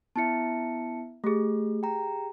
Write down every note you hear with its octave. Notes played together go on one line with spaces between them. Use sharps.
B3 E4 E5 A5 C#7
A3 G4 G#4
G5 A#5